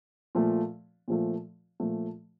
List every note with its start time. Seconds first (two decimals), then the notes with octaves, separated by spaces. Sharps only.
0.35 A#2 F3 A3
1.08 A#2 F3 A3
1.80 A#2 F3 A3